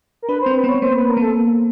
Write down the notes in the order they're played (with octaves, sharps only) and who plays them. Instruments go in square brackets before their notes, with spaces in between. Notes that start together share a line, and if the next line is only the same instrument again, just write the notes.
[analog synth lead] A#4
[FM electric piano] D4 [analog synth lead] B4
[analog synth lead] C5
[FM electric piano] C4
[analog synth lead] B4
[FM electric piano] B3
[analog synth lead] C#5
[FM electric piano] B3
[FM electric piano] A#3 [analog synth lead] C5
[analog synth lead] B4
A#4
[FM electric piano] A#3 [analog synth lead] A4